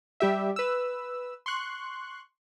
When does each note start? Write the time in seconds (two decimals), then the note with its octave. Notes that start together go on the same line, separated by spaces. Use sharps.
0.20 G3 G4 E5
0.56 B4 E6
1.46 C6 C#6 F#6